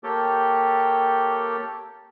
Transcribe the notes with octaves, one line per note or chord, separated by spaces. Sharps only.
A#3 G4 A4 C#5 G5